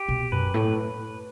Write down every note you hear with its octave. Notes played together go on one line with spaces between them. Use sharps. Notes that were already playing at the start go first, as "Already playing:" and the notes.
Already playing: G4
B2
F#2 B4
A2